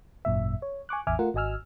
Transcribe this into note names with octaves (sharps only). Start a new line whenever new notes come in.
G#1 F#2 A#2 E5
C#5
G#5 C#6 D6 F#6
A1 E2 E5 G#5 D6 F6
A3 F4 A#4 F#5
G#1 F#4 D#5 G#5 E6 F6